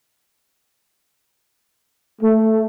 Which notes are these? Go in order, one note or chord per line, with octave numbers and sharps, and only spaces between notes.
A3